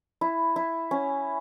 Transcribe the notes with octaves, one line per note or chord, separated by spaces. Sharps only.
E4
E4
C#4